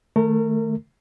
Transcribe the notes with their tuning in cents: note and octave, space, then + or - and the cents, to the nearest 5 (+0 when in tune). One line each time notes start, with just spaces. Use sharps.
D#3 +0 A3 +0 A#4 -30